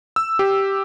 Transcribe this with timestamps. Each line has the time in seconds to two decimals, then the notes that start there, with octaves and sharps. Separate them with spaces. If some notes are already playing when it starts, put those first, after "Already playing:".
0.16 E6
0.39 G4